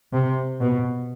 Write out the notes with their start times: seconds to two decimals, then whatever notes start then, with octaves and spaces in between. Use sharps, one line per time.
0.13 C3
0.61 B2